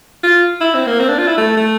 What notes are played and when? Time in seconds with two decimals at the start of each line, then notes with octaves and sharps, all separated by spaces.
0.23 F4
0.61 E4
0.74 C4
0.87 A#3
1.00 C4
1.09 D4
1.18 F4
1.28 E4
1.38 A3
1.57 A3